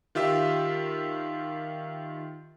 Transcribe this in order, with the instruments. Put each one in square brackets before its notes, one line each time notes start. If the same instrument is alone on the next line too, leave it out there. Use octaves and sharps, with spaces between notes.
[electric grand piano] D#3 F4 G4 E5